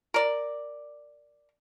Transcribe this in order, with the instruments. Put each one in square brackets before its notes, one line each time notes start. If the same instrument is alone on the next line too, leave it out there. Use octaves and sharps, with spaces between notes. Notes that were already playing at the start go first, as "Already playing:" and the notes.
[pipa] A#4 D5